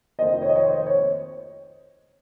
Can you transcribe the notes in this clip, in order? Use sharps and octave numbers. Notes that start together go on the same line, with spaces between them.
F1 F2 D#3 A#3 C5 D#5
C#5
D#5
C#5
C5
C#5